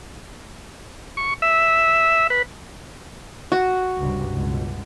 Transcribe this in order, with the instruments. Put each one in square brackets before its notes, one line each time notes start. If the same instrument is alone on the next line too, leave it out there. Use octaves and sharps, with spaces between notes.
[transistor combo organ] C#6
E5
B4
[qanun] F#4
[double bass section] C#2 G2 C3
C#2 B2